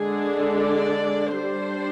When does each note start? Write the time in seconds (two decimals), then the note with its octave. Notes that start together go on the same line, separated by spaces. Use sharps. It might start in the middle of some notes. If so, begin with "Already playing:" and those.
Already playing: D3 G#3 D4 G#4
0.62 D5
1.36 G3 D4 C5